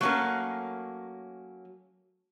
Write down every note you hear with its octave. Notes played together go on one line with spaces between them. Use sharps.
F#3 A3 A#3 C4 C#4 A#4